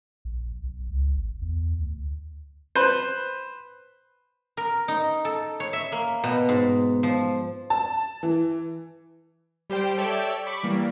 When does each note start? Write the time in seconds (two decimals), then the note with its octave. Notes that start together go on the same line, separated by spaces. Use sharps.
0.25 A#1
0.64 B1
0.89 C#2
1.16 G#1
1.42 E2
1.79 D2
2.76 B4 C5
4.57 A#4
4.88 D#4
5.25 A4
5.60 C#5
5.73 E5
5.92 A#3
6.24 B2
6.49 G#2
7.03 F3
7.70 A5
8.23 E3
9.70 G3 G4 C5 G5
9.97 G4 A4 C#5 D5 E5 G5
10.47 B5 C#6 D6 B6
10.63 E3 G3 A#3